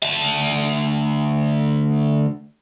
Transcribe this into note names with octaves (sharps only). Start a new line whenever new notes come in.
D2 A5